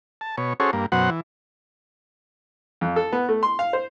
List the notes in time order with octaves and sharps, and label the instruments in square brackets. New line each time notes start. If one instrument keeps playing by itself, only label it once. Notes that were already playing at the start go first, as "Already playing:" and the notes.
[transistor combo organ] A5
B2 C#5
C#4 F#4 G#4 A4 C5 C#5
G2 A#3
F#2 B2 F#3 C5 F#5
E3
[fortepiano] F2
A4
B3
A3
C6
F5
C5